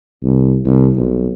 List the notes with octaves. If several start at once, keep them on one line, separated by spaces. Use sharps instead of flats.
C2
C2
B1